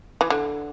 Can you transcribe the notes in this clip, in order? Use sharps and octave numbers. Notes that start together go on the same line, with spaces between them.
E3
D3